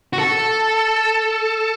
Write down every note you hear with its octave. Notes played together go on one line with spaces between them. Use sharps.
F#4
A4